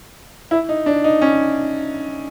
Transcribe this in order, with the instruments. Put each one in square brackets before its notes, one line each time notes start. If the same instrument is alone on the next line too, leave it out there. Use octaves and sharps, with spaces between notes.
[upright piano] E4
D#4
D4
D#4
C#4